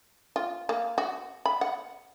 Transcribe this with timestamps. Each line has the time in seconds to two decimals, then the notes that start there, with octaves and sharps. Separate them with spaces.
0.36 F4
0.69 A#3
0.98 F#4
1.46 B5
1.61 F#5